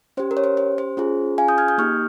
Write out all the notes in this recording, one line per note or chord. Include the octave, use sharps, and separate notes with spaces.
C#4 G4 C5
A#4
C#5
C5
C5
C5
C#4 F4 G#4
F5 G#5
D#6 G6
F6 G#6
D#6 G6
A#3 D#4 G4 C#6 F6